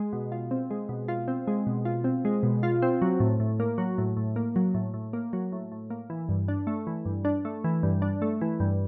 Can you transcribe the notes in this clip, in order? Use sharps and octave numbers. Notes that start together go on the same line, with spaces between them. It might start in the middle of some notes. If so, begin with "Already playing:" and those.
Already playing: G#3
B2
F4
C4
G#3
B2
F4
C4
G#3
B2
F4
C4
G#3
B2
F4
C4
F#3
A2
A2
A#3
F#3
A2
A2
A#3
F#3
A2
A2
A#3
F#3
A2
A2
A#3
E3
G2
D4
A3
E3
G2
D4
A3
E3
G2
D4
A3
E3
G2